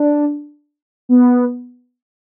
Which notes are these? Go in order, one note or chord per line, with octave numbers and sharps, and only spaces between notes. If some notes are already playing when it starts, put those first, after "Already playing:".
Already playing: D4
B3